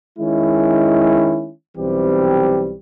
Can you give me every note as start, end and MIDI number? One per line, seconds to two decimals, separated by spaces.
0.19 1.51 51
0.19 1.51 56
0.19 1.51 61
0.19 1.51 64
1.77 2.76 35
1.77 2.76 52
1.77 2.76 55
1.77 2.76 60
1.77 2.76 67